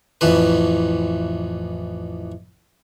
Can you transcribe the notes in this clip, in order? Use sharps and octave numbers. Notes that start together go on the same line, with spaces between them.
A1 F2 E3 B4